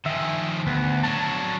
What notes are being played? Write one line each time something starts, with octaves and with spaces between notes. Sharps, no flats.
D#3 F3 E5 G#5
D2 B3
F#3 D4 C#5 A5